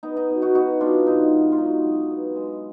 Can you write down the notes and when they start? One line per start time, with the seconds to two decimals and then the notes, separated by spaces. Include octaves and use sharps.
0.03 B3 D#4
0.16 D#4
0.30 B2
0.42 D#4 F#4
0.55 B3 D#4 F#4
0.80 B2 D4 F4
1.06 G#2 D#4
1.33 G#2
1.52 F4
1.58 F#3 D#4
1.85 F#3
2.10 B3
2.36 G#3